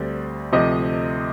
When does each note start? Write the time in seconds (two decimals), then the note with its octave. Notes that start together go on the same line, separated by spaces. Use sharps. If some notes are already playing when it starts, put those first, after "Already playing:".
Already playing: D2 D3 G3 C4 D5
0.52 D2 C3 F3 D#5